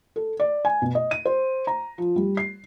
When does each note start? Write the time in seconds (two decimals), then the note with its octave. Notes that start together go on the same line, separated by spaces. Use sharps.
0.16 A4
0.40 D5
0.65 G#5
0.82 B2
0.95 D#5
1.11 D#7
1.25 C5
1.67 A#5
1.98 F3
2.16 G3
2.37 C7